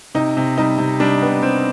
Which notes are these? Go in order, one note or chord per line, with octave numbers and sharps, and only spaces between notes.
C3 D#4
C3
G3 D#4
C3
G3 D4
C3 B3
G3 C4